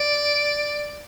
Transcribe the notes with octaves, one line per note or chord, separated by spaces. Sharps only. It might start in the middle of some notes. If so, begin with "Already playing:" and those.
Already playing: D5